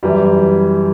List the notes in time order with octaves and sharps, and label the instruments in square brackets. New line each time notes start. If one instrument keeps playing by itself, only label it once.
[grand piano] F#2 E3 G3